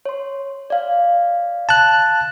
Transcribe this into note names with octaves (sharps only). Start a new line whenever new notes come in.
C#5 C6
D5 F5
A5 F#6